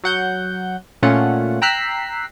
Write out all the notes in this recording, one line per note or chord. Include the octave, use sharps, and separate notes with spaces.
F#3 F#5 G6
A#2 A3 C#4 F4 F#5
G5 A#5 E6 F#6 B6 C7